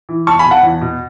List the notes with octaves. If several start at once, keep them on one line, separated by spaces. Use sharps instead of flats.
E3
E2 A5 C#6
G#5 B5
B2
F#5 A5
E2
B2